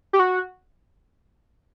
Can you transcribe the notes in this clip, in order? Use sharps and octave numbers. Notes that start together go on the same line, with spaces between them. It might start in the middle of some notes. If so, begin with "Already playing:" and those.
G4
F#4